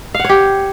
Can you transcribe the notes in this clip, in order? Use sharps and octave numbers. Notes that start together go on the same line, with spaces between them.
G4 C#5 F5 F#5